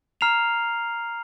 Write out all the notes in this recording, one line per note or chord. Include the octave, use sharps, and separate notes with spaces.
A#5 F6 C7 F7